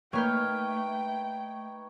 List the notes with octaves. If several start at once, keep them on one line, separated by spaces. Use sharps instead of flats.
A3 A#3 D#4 B4 C#5 G5 F6 G6